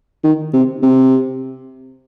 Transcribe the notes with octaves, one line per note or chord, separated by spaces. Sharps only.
D#3
C3
C3